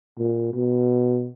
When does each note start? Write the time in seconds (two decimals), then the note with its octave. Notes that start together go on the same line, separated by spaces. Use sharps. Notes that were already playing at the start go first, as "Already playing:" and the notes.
0.18 A#2
0.54 B2